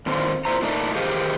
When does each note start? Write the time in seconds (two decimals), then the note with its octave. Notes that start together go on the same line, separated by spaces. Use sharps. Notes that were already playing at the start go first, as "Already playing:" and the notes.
0.06 A#2 D3 D#3 C4 F4
0.45 A#2 E4 C5 A#5
0.62 A#2 A3 D4 D#4
0.95 D#3 G4 G#4 C5 D#5 F5